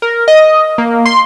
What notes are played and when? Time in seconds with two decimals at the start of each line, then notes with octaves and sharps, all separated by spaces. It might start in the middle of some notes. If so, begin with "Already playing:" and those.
0.02 A#4
0.28 D#5
0.78 A#3
1.05 C6